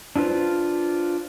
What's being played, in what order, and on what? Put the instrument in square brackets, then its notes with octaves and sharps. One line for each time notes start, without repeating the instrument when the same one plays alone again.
[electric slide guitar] D4 E4 F4 B4 C5